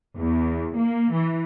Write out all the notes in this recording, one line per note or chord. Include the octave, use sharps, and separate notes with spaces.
E2
A#3
E3